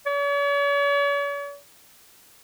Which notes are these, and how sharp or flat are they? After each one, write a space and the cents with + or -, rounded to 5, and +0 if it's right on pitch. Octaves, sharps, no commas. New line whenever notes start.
C#5 +45